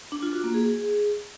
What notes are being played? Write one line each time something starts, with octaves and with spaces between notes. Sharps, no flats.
D4
F4
F#4
A#3
G#4